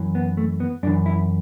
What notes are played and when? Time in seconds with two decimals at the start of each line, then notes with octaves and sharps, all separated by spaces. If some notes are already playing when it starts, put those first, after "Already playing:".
Already playing: F#2 E3
0.15 B3
0.37 A3
0.60 B3
0.83 F#2 D4
0.87 E3
1.06 E4